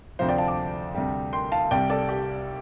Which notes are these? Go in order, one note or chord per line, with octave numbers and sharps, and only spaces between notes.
D2 C3 F3 C5 F5
D5 G5
F5 A5
A5 D6
D2 C3 G3
G5 C6
F5 A5
C2 C3 G3 D5 G5
A4 D5
G4